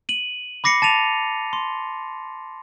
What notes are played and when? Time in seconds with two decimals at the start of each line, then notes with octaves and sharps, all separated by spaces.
0.09 D#7 F#7
0.64 B5 D6 A#6 C7 C#7
0.82 A5 A6 D#7 F7
1.53 C6